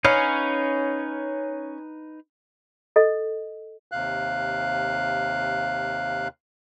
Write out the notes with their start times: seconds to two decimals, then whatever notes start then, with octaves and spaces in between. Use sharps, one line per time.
0.05 C#4 D#4 B4 F5
2.96 A4 D#5
3.91 D#2 C3 F5 F#6